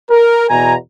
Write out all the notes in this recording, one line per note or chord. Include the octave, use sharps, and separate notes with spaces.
A#4
E2 B2 G#5 A#5